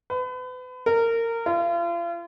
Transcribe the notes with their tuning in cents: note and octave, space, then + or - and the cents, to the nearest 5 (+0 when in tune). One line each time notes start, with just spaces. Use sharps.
B4 +35
A#4 -20
F4 -40